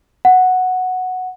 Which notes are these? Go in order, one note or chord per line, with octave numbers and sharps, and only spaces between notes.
F#5